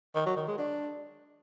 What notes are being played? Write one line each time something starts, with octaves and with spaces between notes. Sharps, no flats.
D#3
F#3
D#3
G#3
D4